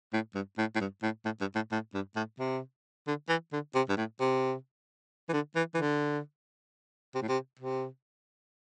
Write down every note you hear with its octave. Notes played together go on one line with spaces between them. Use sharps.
A2
G2
A2
A2
G2
A2
A2
G2
A2
A2
G2
A2
C3
D3
E3
D3
C3
G2
A2
C3
E3
D3
E3
E3
D3
C3
A2
C3
C3